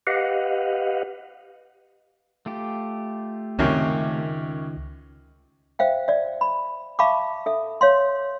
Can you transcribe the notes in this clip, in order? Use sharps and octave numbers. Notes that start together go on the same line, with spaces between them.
G4 B4 D#5 F5 F#5
A3 F4 G4
C#2 F#2 C3 D#3 C#4
C5 E5 F5 G5
D5 E5
B5
E5 F5 A5 B5 C#6 D6
A4 E5
C#5 F5 C6